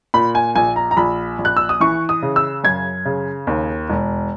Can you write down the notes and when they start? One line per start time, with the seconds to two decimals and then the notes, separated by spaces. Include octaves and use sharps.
0.14 A#2 B5
0.35 G#5
0.55 A#1 G#5
0.76 A#5
0.91 A#5
0.97 A#1 B5
1.38 A#1
1.45 F#6
1.57 E6
1.69 D#6
1.80 E3 C#6
2.09 D#6
2.22 C#3
2.36 E6
2.64 F#2 G#6
3.05 C#3
3.47 D#2
3.89 E1